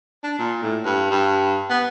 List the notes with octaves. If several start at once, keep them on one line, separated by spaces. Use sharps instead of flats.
D4
A#2
A2
G2
G2
B3